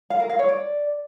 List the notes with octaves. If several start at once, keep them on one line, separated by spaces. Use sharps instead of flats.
F5
A#4
F5
C#5
D5